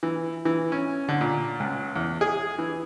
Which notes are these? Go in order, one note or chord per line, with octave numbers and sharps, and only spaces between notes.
E3
E3
C#4
D3
A#2
C#2
E2
G#4
E3